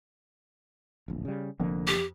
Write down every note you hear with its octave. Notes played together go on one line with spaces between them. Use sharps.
D1 A#1
C#3 G3
F1 F2 D3 A#3
G4